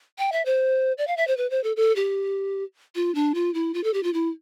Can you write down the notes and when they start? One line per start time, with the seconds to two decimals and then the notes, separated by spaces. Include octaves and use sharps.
0.19 G5
0.32 E5
0.45 C5
0.98 D5
1.07 F5
1.17 E5
1.27 C5
1.37 B4
1.50 C5
1.64 A4
1.77 A4
1.96 G4
2.95 F4
3.15 D4
3.35 F4
3.54 E4
3.74 F4
3.84 A4
3.94 G4
4.03 F4
4.14 E4